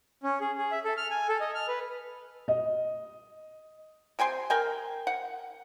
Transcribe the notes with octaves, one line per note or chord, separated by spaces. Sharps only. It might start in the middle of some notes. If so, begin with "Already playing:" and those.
C#4
G#4
G#4
E5
A4
F6
G#5
A4
D#5
F6
B4
D#5
C3 G5 G#5 C6
A#4 G5 G#5
F#5